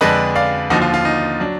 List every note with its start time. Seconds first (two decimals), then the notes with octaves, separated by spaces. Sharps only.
0.01 F2 D3 G#3 D4 B4 D#5
0.35 D5 F5
0.70 D#2 D3 F3 D#4 F#4
0.82 F4
0.94 F4
1.05 D#4
1.40 F#3 D4